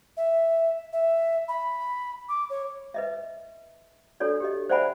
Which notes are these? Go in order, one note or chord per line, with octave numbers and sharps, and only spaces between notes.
E5
E5
B5
D6
C#5
B4 D#5 E5
D4 F#4 A4 C#5 D5
G4 D#5
C5 D5 E5 F#5 G#5 B5